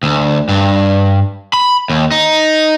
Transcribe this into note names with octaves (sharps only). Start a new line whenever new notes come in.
D2
G2
B5
D#2
D#4